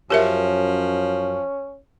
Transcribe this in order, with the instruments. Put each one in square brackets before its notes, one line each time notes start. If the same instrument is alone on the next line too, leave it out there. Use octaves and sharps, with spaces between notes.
[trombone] F#2 [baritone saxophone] F3 [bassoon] C#4 [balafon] G4 A#4 E5